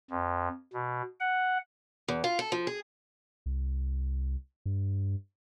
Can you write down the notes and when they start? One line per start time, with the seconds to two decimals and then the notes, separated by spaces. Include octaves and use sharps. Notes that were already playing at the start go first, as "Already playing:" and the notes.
0.10 F2
0.73 B2
1.20 F#5
2.08 E2
2.24 F4
2.39 A4
2.52 F3
2.67 G#4
3.46 C2
4.66 G2